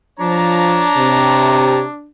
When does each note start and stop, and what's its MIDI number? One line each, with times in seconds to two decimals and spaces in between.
0.20 0.86 53
0.20 2.10 62
0.20 1.84 73
0.20 1.84 81
0.20 1.84 82
0.96 1.83 48